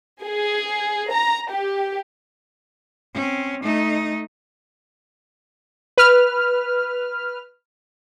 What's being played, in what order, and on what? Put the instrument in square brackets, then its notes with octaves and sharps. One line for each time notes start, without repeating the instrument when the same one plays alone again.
[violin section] G#4
A#5
G4
[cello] C4 C#4
A3 D#4
[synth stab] B4 F6